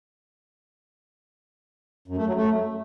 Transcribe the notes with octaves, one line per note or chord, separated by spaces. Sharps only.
F#2
A3
F#3
A3